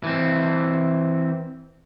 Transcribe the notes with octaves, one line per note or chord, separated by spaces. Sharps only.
E3 C4